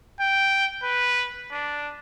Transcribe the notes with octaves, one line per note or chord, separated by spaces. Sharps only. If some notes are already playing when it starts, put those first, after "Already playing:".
G5
B4
D4